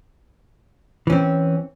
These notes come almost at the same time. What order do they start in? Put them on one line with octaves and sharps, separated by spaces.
E3 C#4 C4